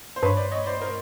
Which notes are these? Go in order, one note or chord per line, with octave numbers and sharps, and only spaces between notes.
C5
G2 B4 C#5
C5 D5
C#5 D#5
C5 D5
A#4 C5